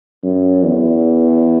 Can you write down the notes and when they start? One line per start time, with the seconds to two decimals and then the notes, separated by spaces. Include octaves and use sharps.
0.23 F#2
0.63 E2